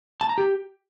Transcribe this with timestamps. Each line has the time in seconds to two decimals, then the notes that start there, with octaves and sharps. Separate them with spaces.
0.21 A5
0.29 A#5
0.38 G4